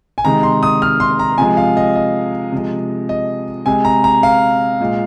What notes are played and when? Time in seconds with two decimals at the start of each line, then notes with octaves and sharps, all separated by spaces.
0.18 G#5
0.25 C3 D#3 G#3 A#5
0.43 C6
0.63 D#6
0.82 F6
1.00 C6
1.19 A#5
1.38 C3 F3 G#3 G#5
1.57 F5
1.77 D#5
1.95 D#5
2.52 C3 F3 G#3
3.09 D#5
3.66 C3 G#3 G#5
3.85 A#5
4.04 A#5
4.23 F5
4.80 A#2 G#3